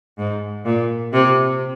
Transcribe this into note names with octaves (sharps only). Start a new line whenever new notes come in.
G#2
A#2
C3